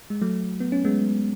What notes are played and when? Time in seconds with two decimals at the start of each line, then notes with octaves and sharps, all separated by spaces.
0.10 G#3
0.22 F#3 A3
0.60 B3
0.72 C#4
0.85 G#3 B3